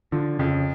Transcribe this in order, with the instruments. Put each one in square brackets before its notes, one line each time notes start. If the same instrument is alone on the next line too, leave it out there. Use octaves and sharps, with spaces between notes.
[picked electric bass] D3 [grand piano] F3
[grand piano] F2 [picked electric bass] C#3